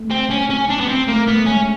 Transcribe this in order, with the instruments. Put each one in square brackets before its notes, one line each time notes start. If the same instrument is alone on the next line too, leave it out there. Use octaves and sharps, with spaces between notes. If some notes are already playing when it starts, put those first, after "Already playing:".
Already playing: [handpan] A3
[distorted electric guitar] C4
C#4
C#4
D4
B3
C4
[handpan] A3 [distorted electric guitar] A#3
[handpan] A3 [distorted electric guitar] B3
[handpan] G#3 [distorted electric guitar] C#4
[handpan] G#3